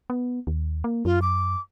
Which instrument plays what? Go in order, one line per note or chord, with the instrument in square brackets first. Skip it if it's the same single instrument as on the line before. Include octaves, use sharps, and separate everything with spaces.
[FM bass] B3
D#2
A#3
[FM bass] F#2 [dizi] F4
[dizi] D6